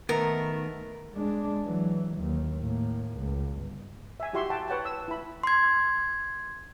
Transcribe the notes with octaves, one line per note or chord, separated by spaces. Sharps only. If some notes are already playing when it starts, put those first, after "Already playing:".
D#3 A3 B3 A#4
G#3 D4
E3 F#3
D#2
A2 A#3
C#2
G1
E5 G#5
E4 F#4 G4 E5 C6 C#6
F#5 G5 A5
B4 C#5 F#5 G5 A5
E6
E4 B5
C6 G#6